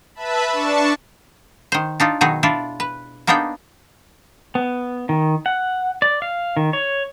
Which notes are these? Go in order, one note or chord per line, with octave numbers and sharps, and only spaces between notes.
B4 E5 A5 B5
D4 A5 C#6
D#3 C5
D4 D#4 F4
B2 D#3 F#3 D#4 G#4
D4 E4 F4
B4
A#3 B3 D4 D#4 G#4 G5
B3
D#3
F#5
D5
F5
D#3
C#5